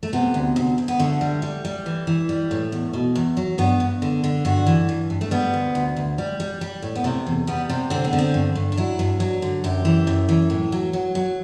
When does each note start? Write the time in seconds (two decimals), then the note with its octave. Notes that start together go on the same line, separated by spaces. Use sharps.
0.03 A3
0.13 C3 B3
0.34 D2
0.56 D2
0.78 D2
0.88 B3
0.99 D3 A3
1.21 G3
1.42 G3
1.65 G3
1.86 E3
2.07 E3
2.29 G3
2.51 A2
2.72 E2
2.93 B2
3.15 E2
3.37 F#3
3.58 G2 B3
3.80 G2
4.02 D3
4.24 D3
4.45 G2 F#4
4.66 E3
4.89 G2
5.10 G2
5.21 A3
5.31 G3 B3
5.54 D2
5.75 D2
5.96 D2
6.18 G3
6.40 G3
6.61 G3
6.82 A2
6.95 B3
7.04 C3 A3
7.26 E2
7.47 G3 B3
7.69 C3
7.90 D3 C4
8.05 B3
8.13 D3
8.19 C4
8.34 G2
8.55 G2
8.72 D4
8.77 F#3 E4
8.99 G2
9.20 F#3
9.42 D3
9.64 F#2 G4
9.85 E3
10.07 F#2
10.29 E3
10.50 A2
10.72 F#3
10.93 F#3
11.15 F#3